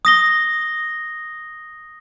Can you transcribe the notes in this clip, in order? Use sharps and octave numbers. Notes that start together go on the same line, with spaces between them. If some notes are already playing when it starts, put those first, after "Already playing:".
D#6 A#6 G7